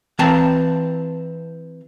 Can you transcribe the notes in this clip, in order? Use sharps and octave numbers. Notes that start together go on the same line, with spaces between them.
E3 C4 F5 A5 A#5